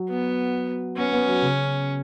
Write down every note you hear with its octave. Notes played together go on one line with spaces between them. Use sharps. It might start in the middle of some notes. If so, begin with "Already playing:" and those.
Already playing: F#3
B3
B3 C#4
B3
F#3
C#3